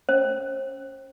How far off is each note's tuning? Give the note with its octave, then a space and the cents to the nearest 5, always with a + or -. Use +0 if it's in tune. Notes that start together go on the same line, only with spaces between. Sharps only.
C#4 +0 C5 +35